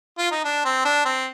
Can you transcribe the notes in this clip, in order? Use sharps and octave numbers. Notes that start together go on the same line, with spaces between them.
F4
D#4
D4
C4
D4
C4